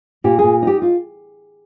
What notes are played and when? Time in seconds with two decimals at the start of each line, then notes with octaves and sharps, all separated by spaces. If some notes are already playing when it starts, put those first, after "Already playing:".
0.24 A#2 G4
0.39 A#2 G#4
0.62 D#4 G4
0.82 F4